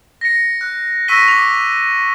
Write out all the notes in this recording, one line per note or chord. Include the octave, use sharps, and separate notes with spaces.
A#6 C#7
F#6
C#6 E6 A#6 B6 D#7 G7
D6 F7